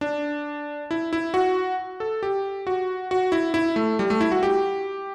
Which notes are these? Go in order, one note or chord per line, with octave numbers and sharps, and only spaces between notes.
D4
E4
E4
F#4
A4
G4
F#4
F#4
E4
E4
A3
G3
A3
E4
F#4
G4